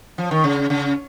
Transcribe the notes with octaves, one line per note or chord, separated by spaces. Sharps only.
F3
D#3
C#3
C#3